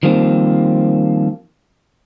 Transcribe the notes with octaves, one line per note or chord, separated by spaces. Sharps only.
D#3 F3 G3 A#3 C4